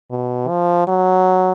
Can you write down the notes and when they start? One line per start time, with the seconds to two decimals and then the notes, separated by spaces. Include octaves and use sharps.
0.11 B2
0.48 F3
0.87 F#3